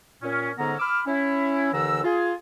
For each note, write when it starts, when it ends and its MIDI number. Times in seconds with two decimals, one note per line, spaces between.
0.23 0.51 46
0.23 0.51 61
0.58 0.74 44
0.58 0.74 50
0.58 0.74 59
0.58 0.74 61
0.58 0.74 82
0.79 1.01 83
0.79 1.01 86
0.79 1.01 88
0.79 1.01 89
1.07 1.71 61
1.07 1.71 64
1.73 2.00 39
1.73 2.00 50
1.73 2.00 52
1.73 2.00 82
1.73 2.00 88
2.04 2.34 65
2.04 2.34 68